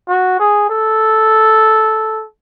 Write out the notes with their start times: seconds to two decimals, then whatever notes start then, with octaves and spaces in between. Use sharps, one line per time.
0.08 F#4
0.39 G#4
0.70 A4